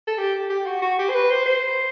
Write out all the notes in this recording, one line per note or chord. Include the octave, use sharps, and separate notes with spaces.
A4
G4
G4
F#4
F#4
G4
C5
B4
C5
C5